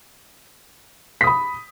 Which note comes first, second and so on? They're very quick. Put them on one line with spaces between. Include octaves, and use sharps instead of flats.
B6 D#6 B5